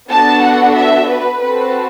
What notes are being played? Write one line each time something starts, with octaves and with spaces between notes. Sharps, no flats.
B3 D4 F#4 A4 A5
F#5
E5
B4
C4 F#4 A4 B4